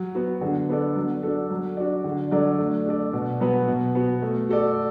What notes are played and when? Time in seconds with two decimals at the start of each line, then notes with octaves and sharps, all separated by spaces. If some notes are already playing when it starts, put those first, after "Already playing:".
Already playing: F#3
0.15 B3 F#4
0.41 D3
0.69 B3 D4 A4 D5
0.96 F#3
1.23 D4 F#4 A4
1.50 F#3
1.77 D4 F#4 D5
2.04 D3
2.31 F#3 D4 A4 D5
2.58 A3
2.86 D4 A4 D5
3.13 B2
3.40 F#3 B3 F#4 B4
3.67 B2
3.95 B3 F#4
4.22 A3
4.49 F#4 A4 D5